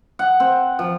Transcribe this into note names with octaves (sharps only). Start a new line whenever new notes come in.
F#5
C4
F3